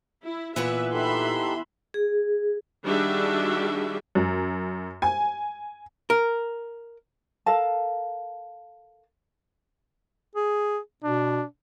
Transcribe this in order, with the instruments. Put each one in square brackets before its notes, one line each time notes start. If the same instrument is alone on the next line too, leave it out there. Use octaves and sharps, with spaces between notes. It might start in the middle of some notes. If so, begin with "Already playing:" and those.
[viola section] E4
[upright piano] A#2 [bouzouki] E3 B3 B4 [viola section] E5
[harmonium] D#4 G4 A4 [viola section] E5 B5 C6
[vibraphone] G#4
[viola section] D#3 G3 D4 F#4 G#4 E5
[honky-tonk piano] F#2
G#5
[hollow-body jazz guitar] A#4
[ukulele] A4 A#4 F5 A5
[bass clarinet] G#4
[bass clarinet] B2 [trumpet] D4